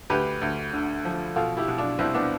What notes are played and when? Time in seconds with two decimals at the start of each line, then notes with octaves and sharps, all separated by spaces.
0.10 D2 G4 B4
0.41 D2
0.73 D3
1.05 F3
1.36 B2 F4 A4
1.57 E4 G4
1.68 B2
1.78 D4 F4
1.99 C2 C4 E4
2.14 B3 D4